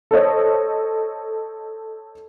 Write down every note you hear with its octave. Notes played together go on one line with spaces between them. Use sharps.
A4 C5 C#5 D#5